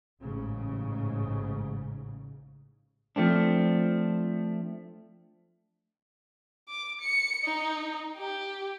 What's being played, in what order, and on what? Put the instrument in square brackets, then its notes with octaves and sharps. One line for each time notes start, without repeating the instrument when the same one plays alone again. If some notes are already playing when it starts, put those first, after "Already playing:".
[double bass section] A1 G#2 C#3
[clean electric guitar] F3 A3 C4 D4
[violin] D6
C#7
D#4
G4